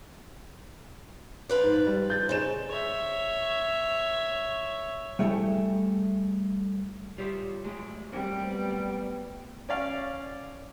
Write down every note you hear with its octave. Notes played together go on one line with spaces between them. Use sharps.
F3 B4 D5
G#2
G3
G6 A6
C#3 D#4 C5 E7
C#5 E5
G3 A3 E4 G#4 A4 G5
G3 F4 C5 C#5 E5
F#3 G#3 A3 G4
G3 A#3 C4
B3
C#4 D5 F5